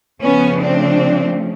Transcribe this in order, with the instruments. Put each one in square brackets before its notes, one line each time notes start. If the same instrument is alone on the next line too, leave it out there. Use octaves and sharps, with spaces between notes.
[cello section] C#3 F3 A3 B3 C#4
C4 D4